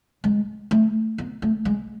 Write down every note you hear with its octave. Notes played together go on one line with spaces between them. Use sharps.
G#3
A3
B3
A3
G#3